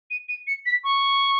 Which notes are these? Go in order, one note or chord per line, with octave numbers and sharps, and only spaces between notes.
D#7
D#7
C#7
B6
C#6